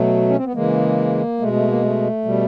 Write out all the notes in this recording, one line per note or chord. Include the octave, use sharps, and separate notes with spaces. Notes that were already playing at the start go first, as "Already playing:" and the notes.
Already playing: B2 F#3 A3
C#4
C4
B3
C#3 E3 G#3 A#3
B2 G#3 A3
A3
A#3
A3
B2 G3